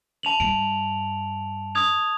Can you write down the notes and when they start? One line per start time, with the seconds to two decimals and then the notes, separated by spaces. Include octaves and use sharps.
0.23 A5 F7 F#7
0.40 G2 D7
1.75 D#6 G#6 F7